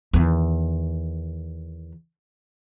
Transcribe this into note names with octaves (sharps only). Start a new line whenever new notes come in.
E2 D#3